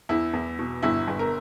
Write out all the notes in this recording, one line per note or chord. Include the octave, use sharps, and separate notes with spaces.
E2 E4
E2
B2
G1 E4
G1
A#4